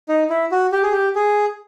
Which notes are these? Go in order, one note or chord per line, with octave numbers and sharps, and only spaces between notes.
D#4
E4
F#4
G4
G#4
G4
G#4